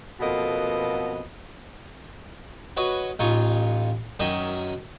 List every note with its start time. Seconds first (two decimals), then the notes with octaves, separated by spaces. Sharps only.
0.20 F2 B2 A#3 B3 A4 D#5
2.77 F#4 B4 C#5 D#5
3.19 A1 D#4 F4 G#5 C#6
4.20 F#2 D#3 C#4 D#5 D#6